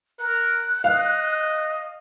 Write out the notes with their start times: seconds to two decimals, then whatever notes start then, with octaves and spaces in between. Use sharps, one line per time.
0.19 A#4 F#6
0.84 D#5 F5